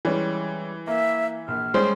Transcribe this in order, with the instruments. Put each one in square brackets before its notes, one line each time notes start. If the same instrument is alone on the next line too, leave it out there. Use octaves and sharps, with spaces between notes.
[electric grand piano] E3 [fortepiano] G3 G#3 C#4
[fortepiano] A#3 [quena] E5
[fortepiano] A#1 [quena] F6
[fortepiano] G3 C#4 G#4 [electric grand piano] G#3 [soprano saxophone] C5